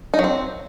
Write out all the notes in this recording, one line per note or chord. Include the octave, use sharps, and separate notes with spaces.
D#4
F#3
C4